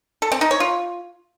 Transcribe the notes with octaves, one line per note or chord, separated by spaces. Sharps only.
A4
C4
D#4
C#5
F4